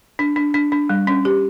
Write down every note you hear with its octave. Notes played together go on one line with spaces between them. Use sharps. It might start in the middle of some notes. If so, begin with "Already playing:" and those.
D4
D4
D4
D4
G3
C#4
G4